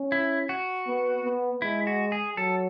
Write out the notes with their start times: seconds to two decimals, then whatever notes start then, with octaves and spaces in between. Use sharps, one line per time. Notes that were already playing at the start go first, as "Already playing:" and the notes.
Already playing: C#4
0.12 E4
0.49 F#4
0.88 B3
1.25 B3
1.62 G#3 E4
1.87 F#4
2.12 G#4
2.37 F#3 A4